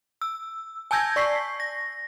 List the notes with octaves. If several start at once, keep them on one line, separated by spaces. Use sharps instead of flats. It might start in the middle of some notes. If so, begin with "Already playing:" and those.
E6
G#5 A5 E6 G6 G#6 A#6
D5 C#6 B6 C7
A#6